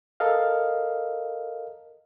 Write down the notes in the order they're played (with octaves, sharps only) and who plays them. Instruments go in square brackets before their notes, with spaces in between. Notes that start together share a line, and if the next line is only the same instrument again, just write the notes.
[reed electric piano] A4 A#4 D#5 F5